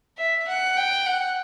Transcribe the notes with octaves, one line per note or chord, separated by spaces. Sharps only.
E5
F#5
G5
F#5